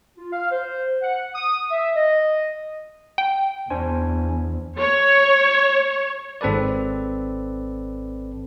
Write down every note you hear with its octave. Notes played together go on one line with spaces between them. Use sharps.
F4
F5
C5
F#5
D#6
E5
D#5
G5
E2 D4 C5 G#5
C#5
G#1 C4 A4 B4 D5